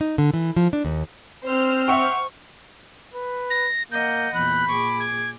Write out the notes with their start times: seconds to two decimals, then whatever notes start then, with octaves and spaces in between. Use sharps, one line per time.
0.01 D#4
0.18 D3
0.34 E3
0.56 F3
0.73 D4
0.85 D#2
1.44 C4 C5 F6
1.88 E5 F#5 G5 C#6
3.14 B4
3.50 A#6
3.92 A#3 D#5 F#5 G6
4.34 E2 A#2 B5 F#6 G6
4.68 A#2 G#4 C#6 D6
5.00 G#6